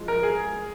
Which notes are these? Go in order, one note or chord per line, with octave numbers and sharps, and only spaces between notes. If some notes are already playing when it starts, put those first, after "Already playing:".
Already playing: F3 G#3
A#4
G#4